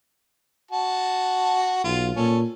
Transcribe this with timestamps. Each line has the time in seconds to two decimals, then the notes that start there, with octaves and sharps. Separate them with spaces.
0.71 F#4 A5
1.84 B1 F4
2.16 A#2 C#4 A4